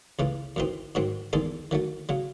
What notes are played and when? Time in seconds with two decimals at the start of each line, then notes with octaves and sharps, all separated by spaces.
0.19 C#2 C#3 E3 A3
0.56 F#2 E3 C4 D#4
0.95 G#2 D#3 F#3 C4
1.33 E2 D#3 G#3 D#4 A4
1.71 D#3 F#3 A3
2.09 C#3 F#3